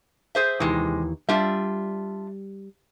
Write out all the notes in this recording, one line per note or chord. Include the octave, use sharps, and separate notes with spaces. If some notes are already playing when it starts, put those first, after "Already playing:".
G#4 C5 E5
D#2 C3 D#3 E3 G#3
G3 D4 F4 E5